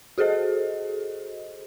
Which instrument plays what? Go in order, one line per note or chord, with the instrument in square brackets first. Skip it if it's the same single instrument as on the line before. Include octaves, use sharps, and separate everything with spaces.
[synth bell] F#4 G#4 A4 C5 D#5